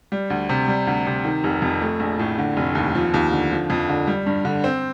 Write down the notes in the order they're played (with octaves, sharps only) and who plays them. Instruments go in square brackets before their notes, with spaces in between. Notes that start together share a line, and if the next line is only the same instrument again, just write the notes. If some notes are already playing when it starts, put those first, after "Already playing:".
[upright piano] G3
D2
C3
G3
D2
C3
D#3
F1
F2
A3
A#1
A2
D3
F1
D#2
F3
D#2
D3
F3
F2
D3
G3
G2
D3
C4